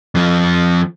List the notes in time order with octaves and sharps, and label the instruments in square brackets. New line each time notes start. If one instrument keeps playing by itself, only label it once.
[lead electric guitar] F2 F3